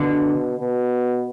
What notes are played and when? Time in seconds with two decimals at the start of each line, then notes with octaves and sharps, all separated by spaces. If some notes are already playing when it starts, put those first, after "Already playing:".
Already playing: B2 D3
0.59 B2